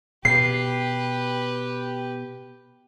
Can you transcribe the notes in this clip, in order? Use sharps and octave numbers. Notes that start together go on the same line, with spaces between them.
B2 G4 B4 C7